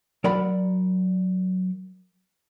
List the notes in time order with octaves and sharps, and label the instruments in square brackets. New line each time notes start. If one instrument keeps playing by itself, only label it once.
[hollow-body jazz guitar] F#3 A#4 D5 F#5 B5